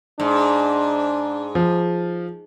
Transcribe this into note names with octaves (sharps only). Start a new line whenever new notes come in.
G#2 D4
F3